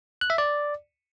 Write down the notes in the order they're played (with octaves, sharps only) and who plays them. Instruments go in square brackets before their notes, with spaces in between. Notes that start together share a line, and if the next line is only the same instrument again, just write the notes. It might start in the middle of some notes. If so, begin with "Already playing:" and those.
[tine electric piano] F#6
E5
D5